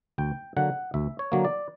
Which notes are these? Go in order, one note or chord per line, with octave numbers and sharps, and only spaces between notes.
D2 G5
D3 F#3 A#3 F#5
D2 E5
C#5
D3 F#3 A#3
D5